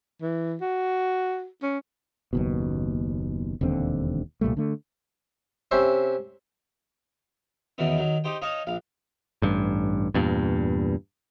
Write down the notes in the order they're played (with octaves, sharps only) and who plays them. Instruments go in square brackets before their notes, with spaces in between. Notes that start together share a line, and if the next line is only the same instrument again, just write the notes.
[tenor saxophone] E3
F#4
C#4
[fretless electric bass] F#1 D#2 B2
E1 D#2 D3 C4
C2 A#2 G3 A3
D3 A3
[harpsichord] C3 C#4 C5 E5
E2 B2 D#3 E3 C#4
D#3 F#3
D#4 G4 C5 G5
D#4 C#5 D#5 F5 A5
A#1 F5
[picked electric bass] A1 G2
E2 G2 A#2